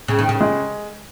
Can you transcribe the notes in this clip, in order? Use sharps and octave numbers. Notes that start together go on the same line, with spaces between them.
C#3
D#3
C#3
G#3